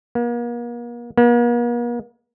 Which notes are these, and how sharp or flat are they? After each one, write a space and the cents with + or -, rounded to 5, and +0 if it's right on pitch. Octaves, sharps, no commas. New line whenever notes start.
A#3 +40
A#3 +45